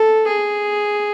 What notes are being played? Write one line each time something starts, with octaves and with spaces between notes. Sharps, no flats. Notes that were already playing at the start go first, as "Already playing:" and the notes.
Already playing: A4
G#4